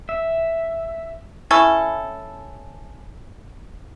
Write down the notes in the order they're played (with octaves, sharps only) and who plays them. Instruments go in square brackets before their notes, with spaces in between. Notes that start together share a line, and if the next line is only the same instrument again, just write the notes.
[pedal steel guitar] E5
[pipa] C#4 E4 A4